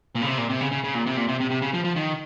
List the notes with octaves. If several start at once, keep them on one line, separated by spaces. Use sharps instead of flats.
A#2
C#3
C3
A#2
C3
C#3
C#3
C#3
A#2
C3
A#2
C3
C3
C3
C#3
F3
F3
D#3